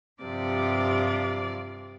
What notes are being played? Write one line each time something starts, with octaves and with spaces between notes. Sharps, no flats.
G2 C3 F3 D5